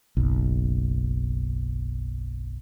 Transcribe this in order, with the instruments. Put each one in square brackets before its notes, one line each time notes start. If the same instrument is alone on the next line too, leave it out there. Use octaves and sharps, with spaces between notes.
[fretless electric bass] F#1 B1